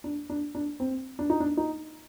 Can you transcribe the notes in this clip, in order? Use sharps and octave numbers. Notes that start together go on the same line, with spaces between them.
D4
D4
D4
C4
D4
D#4
D4
D#4